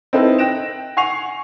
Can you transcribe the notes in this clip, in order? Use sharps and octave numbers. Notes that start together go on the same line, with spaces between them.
C4 D#4 E4 A4 B4
G5 F#6 A#6 D7 E7
F#5 G#5 C#6 C7 F7